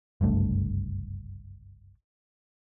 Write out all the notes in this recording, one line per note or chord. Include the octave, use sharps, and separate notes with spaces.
F#1 C2 G2 A3